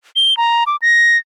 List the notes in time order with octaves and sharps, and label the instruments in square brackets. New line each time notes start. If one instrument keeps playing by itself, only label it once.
[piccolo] G7
A#5
D6
A#6